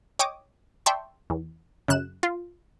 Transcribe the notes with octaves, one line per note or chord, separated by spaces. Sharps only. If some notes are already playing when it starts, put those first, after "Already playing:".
C#5 D#5 G5 D6 D#6
D5 E5 G5 A5 C6 C#6
E2
F#2 C#3 F#6 E7
F4